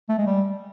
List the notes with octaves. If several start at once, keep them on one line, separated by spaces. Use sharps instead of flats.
A3
G#3
G3